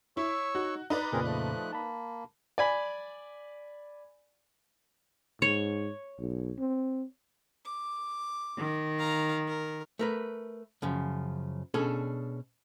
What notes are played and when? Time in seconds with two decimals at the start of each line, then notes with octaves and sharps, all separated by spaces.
0.17 E4 C#5 C#6 E6
0.55 D#4 F#4
0.90 D#4 B4 D5 A#5
1.12 F2 A#2 C#3 C4 G#4 A#4
1.25 F3 A3 F#6
1.73 A#3 A5 B5
2.58 D5 G#5 B5
5.42 G#2 C#5
6.19 B1
6.58 C4
7.65 D6
8.58 D#3
8.98 F5 A#5
9.47 A#4
9.99 A3 A#4 B4
10.82 F#2 C#3 F3
11.74 B2 C#4 D4 G#4 A4